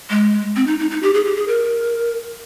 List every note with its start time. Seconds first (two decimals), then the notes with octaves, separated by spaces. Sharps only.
0.10 G#3
0.56 C4
0.67 D#4
0.80 D#4
0.91 D#4
1.03 G4
1.14 G#4
1.25 G4
1.36 G#4
1.48 A#4